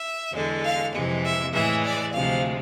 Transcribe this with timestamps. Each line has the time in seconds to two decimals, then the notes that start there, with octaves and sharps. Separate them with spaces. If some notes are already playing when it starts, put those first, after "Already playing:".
Already playing: E5
0.34 E2 D3 G#3
0.64 F5
0.94 F2 C3 E3 G#3
1.24 E5
1.53 A2 E3 G#3 E5
1.84 D5
2.13 D2 C3 F3 G#3 F5